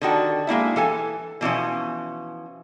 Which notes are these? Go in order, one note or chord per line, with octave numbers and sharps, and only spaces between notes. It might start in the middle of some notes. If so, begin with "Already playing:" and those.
D3 D#3 F#4 A5
G#3 A#3 E4 E5
E3 A4 G#5
B2 E3 F3 C#4